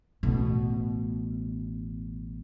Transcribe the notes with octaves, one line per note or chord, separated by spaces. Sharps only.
A1 B2